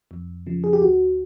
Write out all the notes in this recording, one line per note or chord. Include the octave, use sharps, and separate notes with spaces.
F2
C#3 F3
G#4
G4
D2 F#4